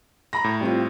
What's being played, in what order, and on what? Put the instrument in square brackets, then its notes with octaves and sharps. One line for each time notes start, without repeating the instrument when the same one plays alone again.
[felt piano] A#5 B5 A#6
[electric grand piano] A2
[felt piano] G3 C4 F4